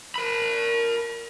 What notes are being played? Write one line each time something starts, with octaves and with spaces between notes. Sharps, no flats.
A#4 B5